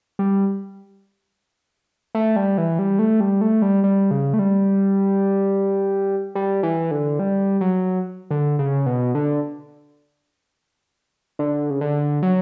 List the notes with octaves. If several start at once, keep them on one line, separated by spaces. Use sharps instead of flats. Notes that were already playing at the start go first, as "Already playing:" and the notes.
G3
A3
G3
E3
G3
A3
G3
A3
G3
G3
C#3
A3
G3
G3
E3
D3
G3
F#3
D3
C#3
B2
D3
D3
C#3
D3
F#3